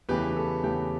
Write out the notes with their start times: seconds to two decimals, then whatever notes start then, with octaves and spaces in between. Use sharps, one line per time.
0.09 E2 C#3 E3 A3 G4 B4
0.36 A4
0.64 E2 C#3 E3 A3 G4